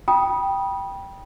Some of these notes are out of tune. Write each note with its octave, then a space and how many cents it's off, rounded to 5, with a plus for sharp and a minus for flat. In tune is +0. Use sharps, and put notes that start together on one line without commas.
G5 +0 B5 -25 D#6 +0